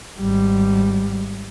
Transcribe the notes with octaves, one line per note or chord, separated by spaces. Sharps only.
G#1 G3